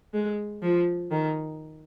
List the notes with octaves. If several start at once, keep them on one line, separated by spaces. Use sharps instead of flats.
G#3
F3
D#3